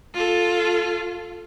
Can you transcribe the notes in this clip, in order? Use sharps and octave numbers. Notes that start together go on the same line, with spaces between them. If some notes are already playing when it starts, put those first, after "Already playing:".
F4 A4